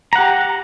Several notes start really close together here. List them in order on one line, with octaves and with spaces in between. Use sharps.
A#5 F#5 G4